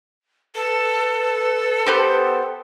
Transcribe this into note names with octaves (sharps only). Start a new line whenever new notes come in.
A4 B4
B3 G4 C5